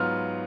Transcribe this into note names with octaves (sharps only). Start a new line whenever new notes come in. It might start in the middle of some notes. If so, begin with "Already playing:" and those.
Already playing: G#2 F#3 B3 F4 F6